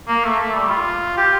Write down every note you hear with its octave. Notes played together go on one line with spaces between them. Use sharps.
A#3
A3
A3
G3
F4
G4